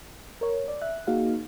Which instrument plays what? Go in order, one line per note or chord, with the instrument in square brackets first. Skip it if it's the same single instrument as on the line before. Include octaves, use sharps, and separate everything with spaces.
[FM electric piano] A#4 C#5
D5
E5 F#6
A#3 D#4 F#4 G#4 F5